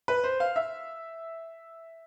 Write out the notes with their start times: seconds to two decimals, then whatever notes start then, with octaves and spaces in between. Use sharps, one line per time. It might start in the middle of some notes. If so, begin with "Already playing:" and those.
0.08 B4
0.24 C5
0.40 F5
0.56 E5